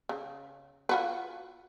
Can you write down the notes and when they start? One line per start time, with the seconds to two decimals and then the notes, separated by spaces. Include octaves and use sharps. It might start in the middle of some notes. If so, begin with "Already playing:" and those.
0.09 C#3
0.89 F4 F#4 B4